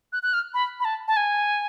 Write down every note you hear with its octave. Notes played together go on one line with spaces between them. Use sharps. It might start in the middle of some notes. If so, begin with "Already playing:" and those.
F#6
F#6
F6
B5
B5
A5
A5
G#5